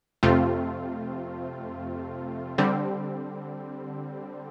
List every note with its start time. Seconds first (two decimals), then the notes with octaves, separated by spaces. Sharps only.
0.23 F2 C3 A3 C4 F4
2.58 D3 G3 C4